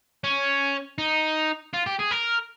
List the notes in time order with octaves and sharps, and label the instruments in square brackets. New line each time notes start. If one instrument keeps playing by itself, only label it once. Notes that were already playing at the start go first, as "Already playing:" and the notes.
[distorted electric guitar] C#4
D#4
F4
G4
G#4
A#4